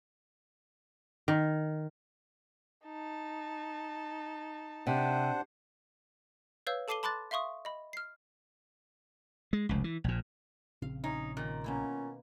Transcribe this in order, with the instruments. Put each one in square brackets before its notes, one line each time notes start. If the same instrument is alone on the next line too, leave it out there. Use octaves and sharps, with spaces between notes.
[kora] D#3
[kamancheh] D#4 A5
[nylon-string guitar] C3 [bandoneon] D4 C5 F#5
[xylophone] B4 C#5 F5 E6 G6
A4 A5 D6 C7 D#7 G7
A5 B5 C6 D6 F#6 A6
E5 F5 C6 C#6 D#6
D#5 B5
F6 C7
[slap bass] G#3
F1 C#2
E3
A#1 A#2
[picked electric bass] A#1 C#3 C4 [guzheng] F5
[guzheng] C#4 [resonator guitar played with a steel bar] D#4
[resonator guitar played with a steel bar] A#2 [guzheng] D#3
[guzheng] B2 A#3 E4 [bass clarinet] C#4